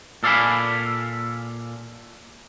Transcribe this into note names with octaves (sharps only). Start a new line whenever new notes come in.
A#2 A4 D5 F5 G#5 B5